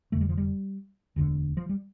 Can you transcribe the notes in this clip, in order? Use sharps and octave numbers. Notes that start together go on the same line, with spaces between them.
F1 F2 D3 A3
G3
F3
G3
E1 D2 D3
F3
G3